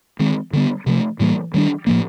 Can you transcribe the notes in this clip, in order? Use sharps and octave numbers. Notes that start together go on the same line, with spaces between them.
D#3 G#3 C4
D3 G3 B3
C3 F3 A3
A2 E3 G3 A#3
D#3 G3 A#3 D4
A2 F3 A#3